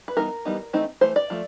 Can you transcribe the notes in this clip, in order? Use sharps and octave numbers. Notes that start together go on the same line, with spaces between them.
B4
E3 G3 B3 D#4 A#4
E3 G3 B3 D#4
E3 A3 C4 D#4
E3 A3 C5
D5
F3 A3